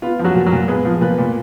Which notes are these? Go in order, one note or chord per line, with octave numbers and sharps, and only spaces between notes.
B3 F4
F3
F#3 F#4
A#2
F#3 F#4
A#2
G#3 B3 G#4
F3
A#2 B3 B4
A#2